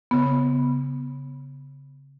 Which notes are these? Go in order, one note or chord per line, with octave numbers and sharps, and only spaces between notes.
C#3 B3